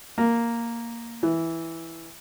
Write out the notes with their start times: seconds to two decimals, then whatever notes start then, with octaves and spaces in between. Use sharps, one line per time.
0.18 A#3
1.23 E3